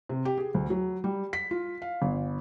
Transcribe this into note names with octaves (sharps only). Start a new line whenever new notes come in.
C3
G4
G#4
D2
F#3
G3
B6
F4
F5
G1